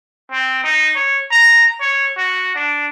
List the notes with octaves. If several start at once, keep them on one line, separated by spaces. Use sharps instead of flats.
C4
D#4
C#5
A#5
C#5
F#4
D4